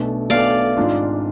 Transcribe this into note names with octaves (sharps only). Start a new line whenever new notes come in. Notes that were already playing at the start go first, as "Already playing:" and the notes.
Already playing: B1 B2 A3 D4 A4
B1 B2 A3 D4 A4 D5 F5
G#1 G#2 G#3 D4 F4